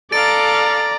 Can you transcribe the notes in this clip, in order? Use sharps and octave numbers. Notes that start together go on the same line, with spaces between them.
A4 D5 F5 A#5 A6 D7